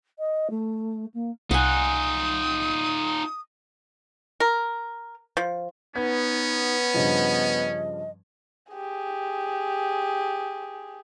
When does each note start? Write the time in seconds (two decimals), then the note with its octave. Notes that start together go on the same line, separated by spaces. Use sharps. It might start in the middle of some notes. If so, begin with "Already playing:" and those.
0.19 D#5
0.50 A3
1.14 A#3
1.51 C2 D#4 F4 F#5 G#5 D#6
4.40 A#4
5.37 F3
5.96 B3 C#4 D#4 G#6
6.94 G2 C#3 F3 D#5
8.72 G4 G#4